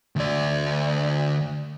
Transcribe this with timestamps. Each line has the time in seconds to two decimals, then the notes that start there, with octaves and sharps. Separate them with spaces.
0.16 D2 D5